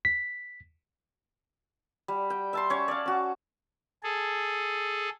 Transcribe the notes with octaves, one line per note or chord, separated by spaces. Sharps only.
B6
G3
G5
E5 A5 C6
C#4 C#5
D5 F5
C#4 F#4
G#4 A4